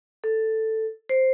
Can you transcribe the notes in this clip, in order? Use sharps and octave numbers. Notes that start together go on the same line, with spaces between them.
A4
C5